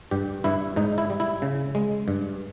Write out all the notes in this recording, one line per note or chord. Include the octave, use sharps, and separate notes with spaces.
G2 G4
G2 E4
G#2 D#4
E4
G3
E4
C#3
G#3
G2